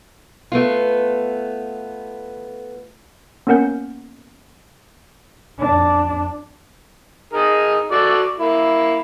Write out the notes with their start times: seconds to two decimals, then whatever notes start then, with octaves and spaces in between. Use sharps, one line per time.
0.52 A3 B3 F4
3.47 A#3 B3 C#4 A#4 F#5 G6
5.59 F2 D4
7.33 D#4 G#4 A#4
7.91 F#4 A4 D5
8.39 A#3 E4